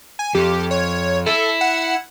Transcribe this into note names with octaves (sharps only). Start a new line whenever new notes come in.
G#5
F2 G4
C#5
E4 A4
F#5